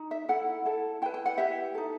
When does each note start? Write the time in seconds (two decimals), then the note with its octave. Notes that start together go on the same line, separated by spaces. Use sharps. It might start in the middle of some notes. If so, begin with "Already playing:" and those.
Already playing: D#4
0.11 E5
0.28 E4 A4 F#5
0.65 E4 A4
1.02 E4 G5
1.06 B4
1.14 G5
1.26 F#5
1.38 E4 G4 B4 E5
1.75 D#4 A4